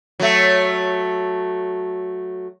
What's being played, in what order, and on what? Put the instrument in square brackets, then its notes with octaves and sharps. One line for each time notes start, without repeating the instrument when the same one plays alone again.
[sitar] F#3 A3